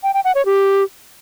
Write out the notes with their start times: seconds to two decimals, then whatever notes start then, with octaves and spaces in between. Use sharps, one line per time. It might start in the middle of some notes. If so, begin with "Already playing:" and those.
0.03 G5
0.14 G5
0.24 F#5
0.35 C#5
0.46 G4